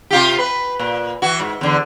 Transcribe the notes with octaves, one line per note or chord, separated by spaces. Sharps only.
C3 F4 G4
B4
A#2
E3 F#4
G#2
E2 D3